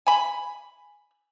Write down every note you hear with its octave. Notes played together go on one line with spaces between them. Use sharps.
G#5 B5